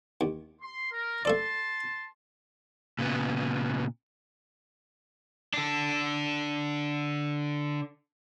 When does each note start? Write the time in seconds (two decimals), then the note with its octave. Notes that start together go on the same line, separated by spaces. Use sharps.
0.21 D#2
0.62 C6
0.92 A#4
1.25 A3 A4 D5 A5 C6
2.99 A#2 C#3 B3
5.54 D3 D4